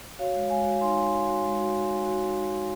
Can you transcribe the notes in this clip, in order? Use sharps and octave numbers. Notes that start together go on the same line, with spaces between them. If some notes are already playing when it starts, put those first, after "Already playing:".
F#4 C#5 F5
G#3
G#3 F5 G#5
F#4
D#4 G#5 C6
G#3
G#3
F#4
G#3
F#4
F#4
D#4
F#4
D#4
F#4
F#4